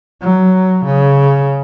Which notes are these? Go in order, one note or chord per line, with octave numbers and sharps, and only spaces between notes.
F#3
C#3